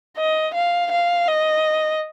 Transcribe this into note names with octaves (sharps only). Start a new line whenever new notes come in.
D#5
F5
F5
D#5